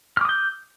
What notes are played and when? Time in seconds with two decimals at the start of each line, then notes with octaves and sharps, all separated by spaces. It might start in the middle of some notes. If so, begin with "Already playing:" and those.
0.17 F6
0.21 D6
0.25 D#6
0.29 G6